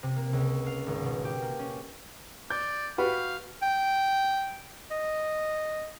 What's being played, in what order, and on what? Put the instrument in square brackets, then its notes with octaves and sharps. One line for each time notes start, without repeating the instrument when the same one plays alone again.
[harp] C3
A#3
C#2
F5
G#1
B2
G4
A#3
C#4
[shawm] D5 [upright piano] G6
[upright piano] F#4 G4 B4 [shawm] F5
[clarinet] G5
D#5